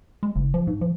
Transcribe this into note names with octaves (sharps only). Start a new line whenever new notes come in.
G#3
F#1
F3
G#2
F3